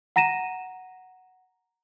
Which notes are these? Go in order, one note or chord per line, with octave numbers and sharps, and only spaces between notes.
F#5 A#5 A#6 D#7 E7